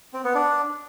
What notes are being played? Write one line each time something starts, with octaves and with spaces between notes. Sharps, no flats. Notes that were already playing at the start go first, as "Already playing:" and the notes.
C4
B3
D4